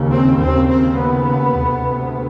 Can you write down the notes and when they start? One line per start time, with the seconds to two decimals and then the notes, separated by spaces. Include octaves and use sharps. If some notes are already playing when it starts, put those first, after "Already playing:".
Already playing: D#2 C#3
0.12 C4
0.40 D#2 C#3 C4
0.69 C4
0.99 B3
1.58 D2 C3